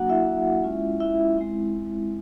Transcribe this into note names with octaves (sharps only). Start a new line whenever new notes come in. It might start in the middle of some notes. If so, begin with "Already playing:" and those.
Already playing: F#3 A#3 D4 F#4 F#5
E4 E5
G#3 C#4 F4
E4 E5
G#3 C4 E4